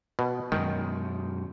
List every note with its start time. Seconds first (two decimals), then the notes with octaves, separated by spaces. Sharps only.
0.19 B2
0.52 F#2 B2 D#3 G#3